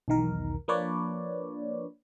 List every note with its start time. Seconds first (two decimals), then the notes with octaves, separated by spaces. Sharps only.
0.08 B1 E2 D#3 A#4
0.68 F3 A#3 D4 B4 C#5 D5